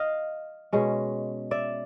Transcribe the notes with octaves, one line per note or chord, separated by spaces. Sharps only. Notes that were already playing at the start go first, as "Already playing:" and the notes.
Already playing: D#5 F5
B2 G#3 C#4
D5 E5